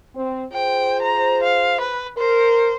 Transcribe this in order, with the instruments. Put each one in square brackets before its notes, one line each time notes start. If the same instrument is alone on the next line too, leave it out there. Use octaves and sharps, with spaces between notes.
[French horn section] C4
[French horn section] F4 G#4 C5 [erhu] G5
[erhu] A#5
F5
B4
[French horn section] A#4 [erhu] C5